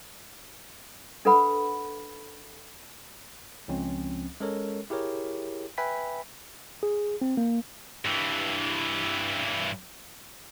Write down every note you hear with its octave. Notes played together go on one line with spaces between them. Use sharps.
D4 A4 B4 F#5 B5
C#2 F3 C4 C#4
G#3 C#4 A4 A#4 C#5
E4 G4 G#4 A#4 C#5
B4 E5 G5 G#5 B5 B6
G#4
C4
A#3
G2 E3